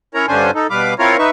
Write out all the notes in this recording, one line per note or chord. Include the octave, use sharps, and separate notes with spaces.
C#4 E4 A#4 C#5 A#5
G2 D3 C#4 D4 C5 G#5
D#4 A4
B2 G3 B4 F5 D6
C4 E4 F4 A#4 C#5 F5
D#4 B4 E5 C#6